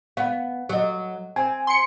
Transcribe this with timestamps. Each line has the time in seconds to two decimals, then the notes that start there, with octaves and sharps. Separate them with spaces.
0.17 B3 F5
0.69 F#3 A4 D#5
1.36 C4 G#5
1.67 C6 C#7